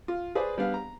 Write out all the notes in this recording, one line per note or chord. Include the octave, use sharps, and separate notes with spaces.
F4
G#4 B4 C5 D5
G3 B3 D4 F5
A#5